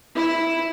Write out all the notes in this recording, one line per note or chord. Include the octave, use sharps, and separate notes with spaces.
E4